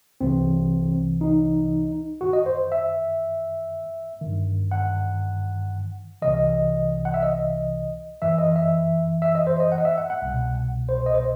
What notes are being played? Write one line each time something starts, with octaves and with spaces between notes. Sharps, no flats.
C2 C3 E3 C4
D#4
F#2 D#3 F#4
D#5
C5
E5
D#3
G2
F#5
C2 C3 E3 D#5
F#5
E5
D#5
F#2 E3 E5
D#5
E5
E5
D#5
C5
D#5
F#5
D#5
E5
F#5
F#5
C2 B2
C5
D#5
C5